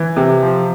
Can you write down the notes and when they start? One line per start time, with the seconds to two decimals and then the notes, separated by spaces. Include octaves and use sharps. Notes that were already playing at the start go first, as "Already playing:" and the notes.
Already playing: E3
0.17 C3
0.42 F3